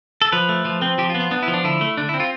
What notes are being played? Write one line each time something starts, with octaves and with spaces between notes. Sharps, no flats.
A4
F3 B4
A3
F3
C4
F3 G4
F4
B3
F4
B3 D4
E4
F3
D4
D3 E4
A3
D3 D4
E4
C4
F4